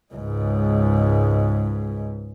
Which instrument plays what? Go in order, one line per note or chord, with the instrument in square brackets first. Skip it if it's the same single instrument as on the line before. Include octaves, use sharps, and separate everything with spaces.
[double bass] C#2 G#2